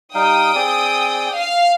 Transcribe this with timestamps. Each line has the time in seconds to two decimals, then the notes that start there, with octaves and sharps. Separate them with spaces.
0.15 G3 D#4 F5 G5 D#6
0.55 C4 G#4 D5
1.36 F5